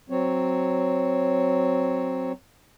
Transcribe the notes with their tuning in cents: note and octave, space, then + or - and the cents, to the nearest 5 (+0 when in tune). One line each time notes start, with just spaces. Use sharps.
F#3 +0 C4 +0 C#5 +0